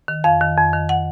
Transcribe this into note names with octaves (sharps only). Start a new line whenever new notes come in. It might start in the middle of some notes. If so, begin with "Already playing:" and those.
D#3
F2 F5
D#3
F2
D#3
F#5